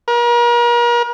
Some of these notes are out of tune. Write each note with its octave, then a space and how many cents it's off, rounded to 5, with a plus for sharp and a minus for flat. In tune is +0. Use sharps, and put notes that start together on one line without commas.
A#4 +40